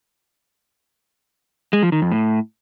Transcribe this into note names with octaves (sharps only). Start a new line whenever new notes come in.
G#3
F3
D#3
F2
A2